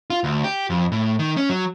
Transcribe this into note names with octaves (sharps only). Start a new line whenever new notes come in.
F4
D2
G4
F2
A2
D#3
C#4
F#3